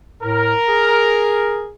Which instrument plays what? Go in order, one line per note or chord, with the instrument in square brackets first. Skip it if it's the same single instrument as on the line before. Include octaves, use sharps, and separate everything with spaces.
[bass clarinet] A2 [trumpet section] A#4
[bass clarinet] G#4